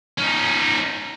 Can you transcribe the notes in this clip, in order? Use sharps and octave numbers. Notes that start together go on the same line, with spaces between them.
C#4 D#4